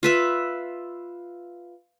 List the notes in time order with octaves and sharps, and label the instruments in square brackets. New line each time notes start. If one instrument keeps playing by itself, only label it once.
[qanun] F4 B4 E5